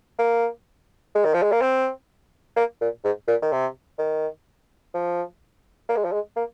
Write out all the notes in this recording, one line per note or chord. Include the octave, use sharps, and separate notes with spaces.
A#3
G#3
D#3
F3
G#3
A#3
C4
A#3
A#2
G#2
A#2
D#3
C3
D#3
F3
A#3
G#3
F3
G#3
A#3